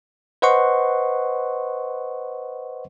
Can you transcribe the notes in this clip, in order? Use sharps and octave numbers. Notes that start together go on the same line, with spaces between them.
B4 C5 D#5 F#5 C6 C#6